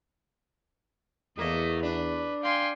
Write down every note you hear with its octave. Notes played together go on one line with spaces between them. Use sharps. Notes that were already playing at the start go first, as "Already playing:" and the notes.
E2 A3 A#3 D#5
D4 B4
F5 G5 G#5 C6